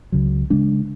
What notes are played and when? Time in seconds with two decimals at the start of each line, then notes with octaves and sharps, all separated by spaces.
0.12 C#2 C#3 F#3
0.50 C#3 G#3 D4